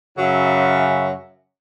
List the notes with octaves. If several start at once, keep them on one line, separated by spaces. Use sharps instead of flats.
F#2 C#3 F#3 C#4 E5